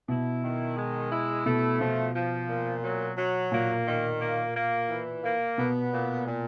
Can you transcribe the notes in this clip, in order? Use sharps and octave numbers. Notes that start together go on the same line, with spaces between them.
B2 E4
D#3
G#3
E4
B2 A3
B2 F3
F3
A#2
F#3
F#3
A#2 A#3
D#3
A#3
A#3
E3
A#3
B2 B3
A#2
A#2